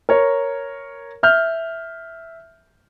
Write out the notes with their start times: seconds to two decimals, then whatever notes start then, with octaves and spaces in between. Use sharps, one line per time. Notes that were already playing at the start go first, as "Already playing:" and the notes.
0.09 A#4 C#5
1.23 E5 F6 G6